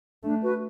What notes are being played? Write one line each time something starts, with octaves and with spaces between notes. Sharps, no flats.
A3 D4
F#4 B4